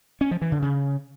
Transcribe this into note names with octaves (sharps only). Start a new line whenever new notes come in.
C#4
F3
E3
D3
C#3